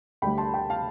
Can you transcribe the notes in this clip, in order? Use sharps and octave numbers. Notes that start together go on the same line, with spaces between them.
D2 D3 G3 G5 B5
A5 C6
G5 B5
F5 A5